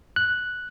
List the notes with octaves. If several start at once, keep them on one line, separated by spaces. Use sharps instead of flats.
F#6